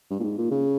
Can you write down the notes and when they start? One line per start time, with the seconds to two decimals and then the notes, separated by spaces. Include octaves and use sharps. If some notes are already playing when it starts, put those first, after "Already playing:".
0.11 G2
0.20 A#2
0.23 G#2
0.38 A#2
0.51 C#3